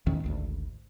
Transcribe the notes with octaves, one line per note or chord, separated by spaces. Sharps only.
A1 E2 D#3 C#4
G#1 D2